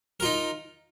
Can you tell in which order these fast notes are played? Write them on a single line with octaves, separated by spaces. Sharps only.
A#4 F4 D#4